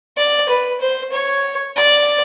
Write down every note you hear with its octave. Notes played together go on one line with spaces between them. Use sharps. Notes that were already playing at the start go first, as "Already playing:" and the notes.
D5
B4
C5
C#5
D5